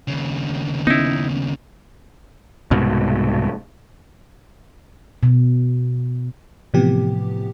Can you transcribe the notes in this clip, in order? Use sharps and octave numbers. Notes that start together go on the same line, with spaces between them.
D#2 C#3
B3 C#4 D#4 E4
C2 G#2 B2
B2
A2 C3 E3 F3 B3 G4